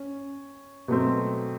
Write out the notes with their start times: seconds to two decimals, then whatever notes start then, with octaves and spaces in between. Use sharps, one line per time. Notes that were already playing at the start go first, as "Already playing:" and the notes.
Already playing: C#4
0.88 B2 F#3 A3 C4